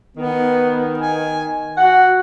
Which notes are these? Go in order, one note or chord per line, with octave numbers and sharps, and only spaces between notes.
D#3 B3
G#5
F#4 F#5